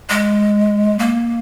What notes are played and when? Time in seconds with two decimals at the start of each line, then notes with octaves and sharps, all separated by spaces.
0.10 G#3
0.99 A#3